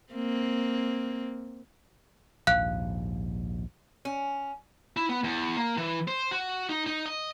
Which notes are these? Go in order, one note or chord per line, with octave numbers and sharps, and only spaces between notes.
A#3 C4
A#1 D#2 G#2 F5 F#6
C#4
E4
B3
E2
A#3
E3
C5
F#4
D#4
D#4
D#5